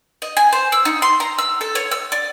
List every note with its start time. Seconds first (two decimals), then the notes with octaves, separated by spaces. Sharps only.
0.22 D#5
0.37 G#5
0.52 C5
0.72 E6
0.85 D#4
1.02 C6
1.20 A#5
1.38 E6
1.61 A4
1.75 C#5
1.91 E6
2.12 D5